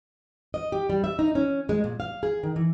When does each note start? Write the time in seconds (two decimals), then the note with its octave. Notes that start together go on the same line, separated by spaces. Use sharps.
0.54 D#5
0.72 G4
0.90 G3
1.04 E5
1.19 D#4
1.35 C#4
1.69 G#3
1.84 A#2
2.00 F5
2.23 G#4
2.43 D#3
2.56 E3